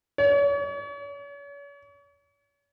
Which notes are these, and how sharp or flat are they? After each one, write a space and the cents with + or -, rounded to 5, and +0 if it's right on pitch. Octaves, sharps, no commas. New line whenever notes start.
C#5 +40